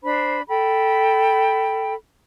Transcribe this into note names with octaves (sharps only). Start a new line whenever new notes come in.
D4 C5 B5
A4 G5 B5